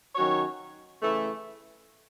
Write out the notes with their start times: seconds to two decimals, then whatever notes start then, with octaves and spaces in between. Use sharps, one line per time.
0.16 D#3 F#3 C#4 F#4 C#5
1.00 C#3 E3 A3 E4